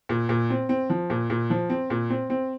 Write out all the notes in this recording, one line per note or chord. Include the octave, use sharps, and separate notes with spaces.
A#2
A#2
C4
C4
F3
A#2
A#2
F3
C4
A#2
C4
C4